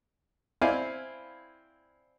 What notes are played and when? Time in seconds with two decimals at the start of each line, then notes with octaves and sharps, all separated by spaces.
0.62 C4 E4 D5 F5 G#5